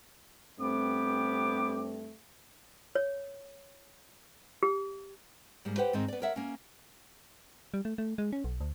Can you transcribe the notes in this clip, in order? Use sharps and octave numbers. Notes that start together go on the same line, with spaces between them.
G2 A3 B3 C4 G4 D6
C#5
G4
G#2 G3 A#3
G4 B4 C5 F#5 G5
G#2 D#3 C4 D#5
B3 D5
A#4 C#5 E5 F#5
A#3 C#4
G3
A3
A3
G#3
C#4
B1
D2